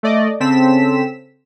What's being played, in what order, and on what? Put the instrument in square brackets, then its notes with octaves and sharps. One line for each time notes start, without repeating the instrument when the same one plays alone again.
[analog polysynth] A3 D5 D#5
C#3 C4 A4 B6 E7